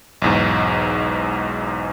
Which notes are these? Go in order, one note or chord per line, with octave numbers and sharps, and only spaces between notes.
B1 E2 G#2